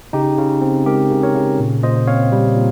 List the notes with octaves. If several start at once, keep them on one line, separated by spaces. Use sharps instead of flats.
C#3 D#4 G4
C#3
C4
G#3 G4 A#4
C#3
A#4 C#5
C#3
A#2
A#2 C5 D#5
C4 C#5 F5
G3
A#2